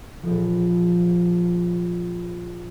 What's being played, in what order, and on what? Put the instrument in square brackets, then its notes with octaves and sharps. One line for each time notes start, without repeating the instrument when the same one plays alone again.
[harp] A#1 F3